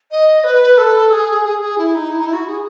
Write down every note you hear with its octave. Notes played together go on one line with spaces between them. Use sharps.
D#5
B4
A4
G#4
G#4
G#4
E4
D#4
E4
D#4
E4
F#4
G#4